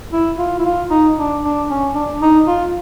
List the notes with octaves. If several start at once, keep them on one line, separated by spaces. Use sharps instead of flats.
E4
F4
E4
F4
D#4
D4
D4
C#4
D4
D#4
F4